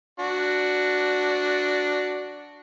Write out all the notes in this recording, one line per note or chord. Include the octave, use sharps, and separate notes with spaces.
D4 F#4